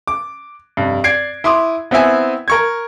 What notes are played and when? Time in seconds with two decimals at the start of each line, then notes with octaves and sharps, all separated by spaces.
0.07 D6
0.77 F1 G2
1.04 D5 G#6 C7 D7
1.44 E4 C6 D6 D#6
1.91 B3 C4 E4 E5 G#5
2.48 A#4 C#6 G#6